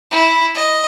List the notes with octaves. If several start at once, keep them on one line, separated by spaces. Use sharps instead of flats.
E4
D#5